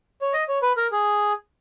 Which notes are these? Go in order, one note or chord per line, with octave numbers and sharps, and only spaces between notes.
C#5
D#5
C#5
B4
A#4
G#4